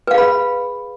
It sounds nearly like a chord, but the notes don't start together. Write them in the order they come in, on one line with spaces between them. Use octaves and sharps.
B4 F5 G#4 B5